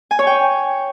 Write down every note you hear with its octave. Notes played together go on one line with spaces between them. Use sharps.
G#5
C#5
G5